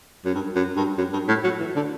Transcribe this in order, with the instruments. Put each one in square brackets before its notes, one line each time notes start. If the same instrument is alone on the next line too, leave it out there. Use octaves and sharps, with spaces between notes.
[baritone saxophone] F#2
G2
F#2
G2
F#2
G2
A2
F#3
E3
D3